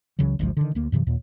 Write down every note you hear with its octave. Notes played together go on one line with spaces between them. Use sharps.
C#2 C#3 E3 F#3
G#1 D2 F3 G#3
D3 D#3
D2 A#3
G2 C3 E3 F#3
D#2 A#2